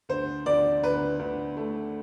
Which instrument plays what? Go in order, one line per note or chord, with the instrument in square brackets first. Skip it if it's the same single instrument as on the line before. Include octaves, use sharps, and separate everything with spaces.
[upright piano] D2 C5
D2 D5
D2 B4
D2
A3